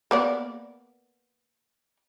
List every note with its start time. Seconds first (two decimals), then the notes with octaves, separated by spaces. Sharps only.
0.11 A#3 B3 D5